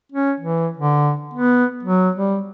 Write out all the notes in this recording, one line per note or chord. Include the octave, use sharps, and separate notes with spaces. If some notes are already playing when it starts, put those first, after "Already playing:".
C#4
E3
D3
B3
F#3
G3